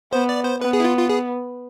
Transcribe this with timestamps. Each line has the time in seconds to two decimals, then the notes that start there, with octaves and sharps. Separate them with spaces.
0.12 B3 C5
0.29 D5
0.44 C5
0.61 B3 B4
0.73 G#4
0.80 E4
0.84 F4
0.98 F4
1.09 G#4